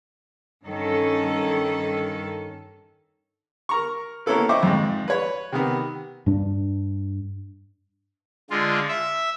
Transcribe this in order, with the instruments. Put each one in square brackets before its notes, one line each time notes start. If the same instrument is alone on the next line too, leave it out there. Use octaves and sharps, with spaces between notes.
[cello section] G2 D#3 C#4 A4
[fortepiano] A#4 A#5 C#6
A#3 B3 C#4 E4 A4 B4
C5 D#5 E5 G5 C#6 D6
F2 G#2
B4 C#5
C3 D#3 B3
[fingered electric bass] G2 D4
[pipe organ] D3 G#3 F4
E5